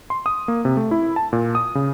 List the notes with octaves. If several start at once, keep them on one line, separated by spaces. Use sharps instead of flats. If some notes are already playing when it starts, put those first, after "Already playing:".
C6
D#6
A#3
C3
A3
E4
A5
A#2
D#6
C#3